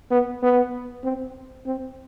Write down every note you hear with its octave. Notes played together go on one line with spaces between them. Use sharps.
B3
B3
C4
C4